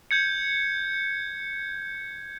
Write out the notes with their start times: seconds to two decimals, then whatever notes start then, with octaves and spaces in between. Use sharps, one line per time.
0.11 G6 G#6 C#7